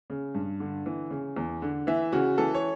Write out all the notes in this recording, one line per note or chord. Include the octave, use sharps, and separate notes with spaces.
C#3
G2
D3
E3
C#3
E2
D3
E3 E5
C#3 F#4
E3 A4
C#5